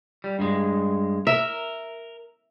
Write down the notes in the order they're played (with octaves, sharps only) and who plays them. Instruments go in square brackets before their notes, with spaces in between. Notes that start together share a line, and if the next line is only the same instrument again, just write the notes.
[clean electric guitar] G3
G2 G#3
[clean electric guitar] A#4 [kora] E5